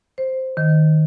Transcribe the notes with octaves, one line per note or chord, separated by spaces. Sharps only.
C5
D#3